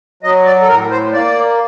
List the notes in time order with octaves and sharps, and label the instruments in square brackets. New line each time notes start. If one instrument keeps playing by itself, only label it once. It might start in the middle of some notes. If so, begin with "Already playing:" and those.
[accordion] F#3 D#5
D5
A4
A2 A#4
C5
A#3 D5